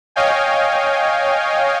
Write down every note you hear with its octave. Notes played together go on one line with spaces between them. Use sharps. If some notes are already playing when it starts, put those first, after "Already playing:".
C#5 D#5 F5 G5 G#5